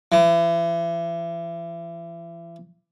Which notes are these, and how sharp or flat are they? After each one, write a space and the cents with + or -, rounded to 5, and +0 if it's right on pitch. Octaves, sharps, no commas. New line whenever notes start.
E3 +35